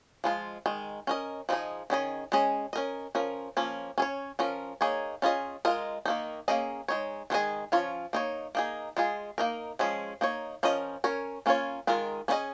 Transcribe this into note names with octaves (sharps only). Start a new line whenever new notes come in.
F3 G#3 F4
D#3 G#3
C#4 A#4 D#5
F3 G#3 D#4 G#4 D#5
D#3 C#4 G#4 D#5
G#3 C#4 G#4 D#5
C#4 A#4 D#5
F3 C#4 A#4
F3 A#3 C#4
C#4 G#4 C#5
F3 C#4 A#4
A#3 D#4 G#4 C#5
C#4 F4 G#4 D#5
G#3 F4 A#4 D#5
D#3 A#3 D#4
A#3 C#4 G#4 D#5
G#3 D#4 C#5
D#3 G#3 F4 G#4 D#5
F3 C#4 F4 C#5
A#3 D#4 C#5
A#3 D#4 G#4
G#3 F4 G#4
A#3 D#4 A#4
F3 G#3 C#4 G#4
A#3 D#4 C#5
F3 C#4 A#4 D#5
C#4 A#4 C#5
A#3 C#4 F4 C#5
D#3 G#3 F4 A#4
A#3 C#4 F4 G#4 D#5